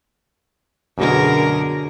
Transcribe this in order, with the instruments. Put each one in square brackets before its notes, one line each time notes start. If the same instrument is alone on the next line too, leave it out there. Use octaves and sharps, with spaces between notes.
[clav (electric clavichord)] F#2 B2 [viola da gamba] D3 G#4 A#4